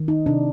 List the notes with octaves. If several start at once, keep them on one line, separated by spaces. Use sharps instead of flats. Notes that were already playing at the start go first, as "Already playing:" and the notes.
Already playing: D#3
D#4
C3 D4